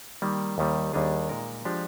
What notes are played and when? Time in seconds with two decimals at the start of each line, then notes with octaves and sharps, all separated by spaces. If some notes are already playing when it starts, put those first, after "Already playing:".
0.22 D#3 G3 A#3
0.58 D#2 D#3 G3 A#3
0.93 D#2 D#3 G3 D4 G#4
1.29 A#2 G#3 D#4 A#4
1.65 F3 G#3 D4 G4